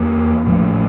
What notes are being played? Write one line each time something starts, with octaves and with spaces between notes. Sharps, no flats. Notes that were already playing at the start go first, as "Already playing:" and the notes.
Already playing: E2 E3 A#3
A1 A2 F3 A3